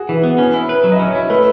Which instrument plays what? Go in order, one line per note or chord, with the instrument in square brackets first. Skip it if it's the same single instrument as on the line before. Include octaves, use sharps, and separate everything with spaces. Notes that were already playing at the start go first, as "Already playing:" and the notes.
Already playing: [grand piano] F#4 G#4
[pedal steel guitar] E3
B3
C#4
E4
B4
F#3
[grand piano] D#5
[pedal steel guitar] C#4 [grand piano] E5
[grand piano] C#5
[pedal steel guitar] E4 [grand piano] D#5
[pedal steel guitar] A3 [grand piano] B4